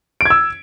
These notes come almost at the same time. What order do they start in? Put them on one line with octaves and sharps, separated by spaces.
D7 G#6 E6